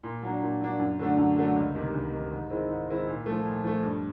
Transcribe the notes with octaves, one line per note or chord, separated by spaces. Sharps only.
A#2
F#3 A#3 D4
A#2
F#3 A#3 D4
F#2
D3 F#3 A3 D4
F#2
D3 F#3 A3 D4
C#2
C3 D#3
C#2
C3 D#3
G#2
D#3 G#3 C4 E4
G#2
D#3 G#3 C4 E4
A#2
F3 A3
A#2
F3 A3
G2